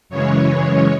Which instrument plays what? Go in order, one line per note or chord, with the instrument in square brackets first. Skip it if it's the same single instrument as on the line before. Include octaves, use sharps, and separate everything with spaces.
[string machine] F#2 C#3 E3 G#3 C#5